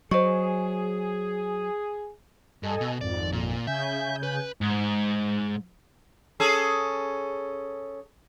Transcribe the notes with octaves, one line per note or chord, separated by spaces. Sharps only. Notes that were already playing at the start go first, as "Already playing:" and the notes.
F#3 G#4 C5 D#5 C#6
G2 A4 D#5 G#5
B2
G#1 F2 D5
A#2
C#3 E5 G#5 G6
B4
G#2
C#4 G#4 A4